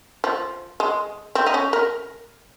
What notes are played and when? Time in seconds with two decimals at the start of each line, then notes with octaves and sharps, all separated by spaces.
0.24 F3
0.80 G#3
1.35 C4
1.46 D#4
1.54 C#4
1.73 A#4